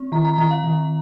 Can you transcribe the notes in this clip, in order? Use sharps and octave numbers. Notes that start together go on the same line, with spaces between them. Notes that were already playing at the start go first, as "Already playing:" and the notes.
Already playing: C4
D#3 A#5
A#5
D#3 A#5
F5
D#3